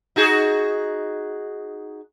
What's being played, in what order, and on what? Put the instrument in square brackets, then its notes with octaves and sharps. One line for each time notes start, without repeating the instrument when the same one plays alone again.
[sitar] D#4 F#4 G#4